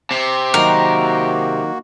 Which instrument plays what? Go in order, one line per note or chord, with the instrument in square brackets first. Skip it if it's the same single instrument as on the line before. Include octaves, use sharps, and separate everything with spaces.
[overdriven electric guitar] C3
[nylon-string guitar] D#3 F#3 [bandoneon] A#3 F#4 [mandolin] A#4